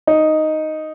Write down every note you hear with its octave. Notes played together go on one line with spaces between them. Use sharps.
D#4